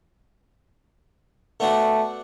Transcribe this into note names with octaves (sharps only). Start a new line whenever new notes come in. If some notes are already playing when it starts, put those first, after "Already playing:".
A3 B3 D4 F#4